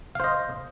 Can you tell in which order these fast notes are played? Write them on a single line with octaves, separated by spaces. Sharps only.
F5 C5 D#5